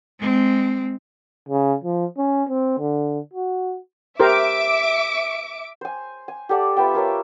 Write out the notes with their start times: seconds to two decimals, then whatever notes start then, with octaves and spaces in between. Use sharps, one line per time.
0.20 G#3 C4
1.48 C#3
1.84 F3
2.18 C#4
2.49 C4
2.79 D3
3.33 F#4
4.20 G4 A#4 C5 E5 D6 D7
5.81 C5 G#5
6.28 G#5
6.49 G4 A4 D5 F#5
6.77 B3 F4 E5 G5
6.94 F4 A#4 C#5 E5